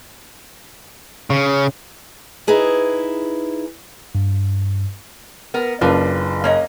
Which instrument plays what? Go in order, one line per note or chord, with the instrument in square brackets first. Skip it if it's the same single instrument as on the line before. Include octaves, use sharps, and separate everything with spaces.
[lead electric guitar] C#3
[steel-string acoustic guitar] D#4 E4 G#4 B4
[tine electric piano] G2
[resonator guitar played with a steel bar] B3 A#4
[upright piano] F#1 [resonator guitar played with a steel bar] D4 F4 B4
[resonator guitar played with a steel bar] A#3 C#5 D#5